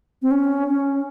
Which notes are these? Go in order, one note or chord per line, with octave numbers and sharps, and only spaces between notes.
C4
C#4
C#4